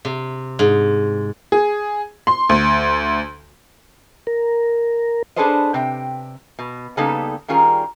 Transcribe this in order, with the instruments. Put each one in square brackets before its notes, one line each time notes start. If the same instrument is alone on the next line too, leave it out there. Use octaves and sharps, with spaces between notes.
[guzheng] C3
G#2
[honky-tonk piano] G#4
C6
D2
[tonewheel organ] A#4
[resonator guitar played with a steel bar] D4 G#4 A4 B4 C5 D#5
C3 G5
B2
C#3 G3 A#3 B3 D#4 A4
D#3 G3 C#4 F4 G#4 A#4